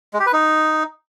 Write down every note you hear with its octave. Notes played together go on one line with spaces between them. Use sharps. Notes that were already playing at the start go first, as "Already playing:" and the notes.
G#3
G4
B4
D#4